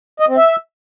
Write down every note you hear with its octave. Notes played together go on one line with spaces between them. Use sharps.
D#5
C4
E5